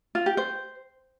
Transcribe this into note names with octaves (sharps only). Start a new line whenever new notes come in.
F4
G4
C5